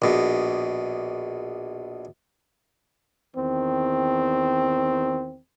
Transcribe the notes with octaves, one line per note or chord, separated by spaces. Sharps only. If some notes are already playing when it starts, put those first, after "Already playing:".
A#1 B2
E2 D#3 C4